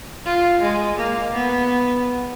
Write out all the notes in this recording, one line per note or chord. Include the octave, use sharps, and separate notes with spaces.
F4
G#3
A#3
B3